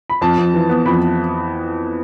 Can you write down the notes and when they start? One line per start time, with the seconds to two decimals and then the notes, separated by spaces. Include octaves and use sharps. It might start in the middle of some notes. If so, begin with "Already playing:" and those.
0.10 B5
0.21 F2 A5
0.38 F2
0.54 E3
0.69 B3
0.85 F2 B5